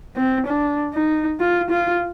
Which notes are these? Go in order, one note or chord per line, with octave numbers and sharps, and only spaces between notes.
C4
D4
D#4
F4
F4